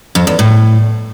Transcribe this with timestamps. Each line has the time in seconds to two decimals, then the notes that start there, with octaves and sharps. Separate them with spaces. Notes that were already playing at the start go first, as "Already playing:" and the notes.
0.15 F2
0.27 E2
0.39 A2